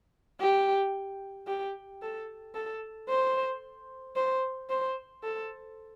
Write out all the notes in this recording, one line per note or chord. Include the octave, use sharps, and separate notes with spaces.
G4
G4
A4
A4
C5
C5
C5
A4